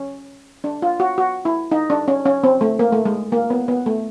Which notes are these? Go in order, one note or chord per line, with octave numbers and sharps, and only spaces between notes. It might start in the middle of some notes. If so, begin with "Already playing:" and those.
Already playing: C#4
D4
F4
F#4
F#4
E4
D#4
D4
C#4
C#4
C4
A3
A#3
A3
G#3
A#3
B3
B3
A3